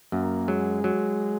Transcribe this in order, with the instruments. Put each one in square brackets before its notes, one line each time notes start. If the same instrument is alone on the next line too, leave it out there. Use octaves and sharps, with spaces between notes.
[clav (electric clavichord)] F#2 [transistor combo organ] A#3
[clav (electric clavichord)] F#3 [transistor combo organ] G#3
[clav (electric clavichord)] F#3